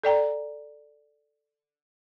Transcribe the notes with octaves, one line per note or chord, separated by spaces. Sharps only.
A4 D5 G5 A#5